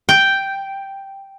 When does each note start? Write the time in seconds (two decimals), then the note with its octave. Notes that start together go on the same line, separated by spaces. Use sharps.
0.09 G5